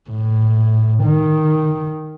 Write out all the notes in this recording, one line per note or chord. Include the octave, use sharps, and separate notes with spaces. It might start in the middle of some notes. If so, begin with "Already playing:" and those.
A2
D#3